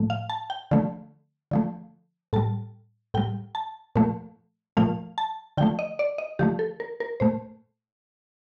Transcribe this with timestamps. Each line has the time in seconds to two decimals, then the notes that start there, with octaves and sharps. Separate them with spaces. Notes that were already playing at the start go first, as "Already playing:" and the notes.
Already playing: A2 F3 A3
0.10 F5
0.30 A5
0.50 G5
0.71 D3 F3 A3
1.51 D3 F3 A3
2.33 A2 G3 A5
3.14 A2 G3 G5
3.55 A5
3.96 A#2 F3 A3
4.77 A#2 F3 A3 F5
5.18 A5
5.57 D3 G5
5.61 F3 A3
5.79 D#5
5.99 D5
6.18 D#5
6.39 D3 F3 A3 G4
6.59 A4
6.80 A#4
7.00 A#4
7.20 A#2 A3 C5